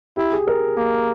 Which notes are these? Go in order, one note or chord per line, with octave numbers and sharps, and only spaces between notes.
E4 G4
G#4
A#4
A#3